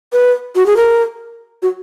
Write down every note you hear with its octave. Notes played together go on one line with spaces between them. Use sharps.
B4
F#4
G#4
A#4
F#4